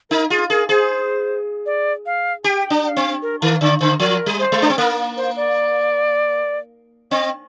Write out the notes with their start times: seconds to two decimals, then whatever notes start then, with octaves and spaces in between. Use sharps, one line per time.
0.10 D#4 A#4
0.30 F4 G#4
0.50 G#4 A#4
0.69 G#4 C5
1.66 D5
2.06 F5
2.44 G4 G5 G#5
2.70 D4
2.83 G5
2.88 F5
2.96 C4
3.22 A#4
3.42 D#3 A#4
3.61 D3 D5
3.81 D3 C5
4.00 F3 A#4
4.26 G3
4.39 C5
4.52 G#3
4.62 D4
4.70 C4
4.78 A#3 A#4
5.17 C5
5.36 D5
7.11 C4 D#5